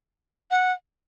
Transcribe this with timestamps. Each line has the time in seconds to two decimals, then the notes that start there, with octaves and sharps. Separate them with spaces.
0.51 F#5